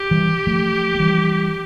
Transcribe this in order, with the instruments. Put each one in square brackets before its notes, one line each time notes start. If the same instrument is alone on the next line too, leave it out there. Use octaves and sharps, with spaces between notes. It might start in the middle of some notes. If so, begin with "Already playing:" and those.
Already playing: [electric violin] G4
[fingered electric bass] E3 G3
F3 A3
A3
E3 G3